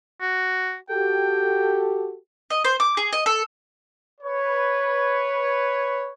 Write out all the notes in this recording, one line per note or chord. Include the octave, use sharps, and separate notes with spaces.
F#4
F#4 G4 A4 G5
D#5
C5
D6
G#4
D#5
A4
B4 C#5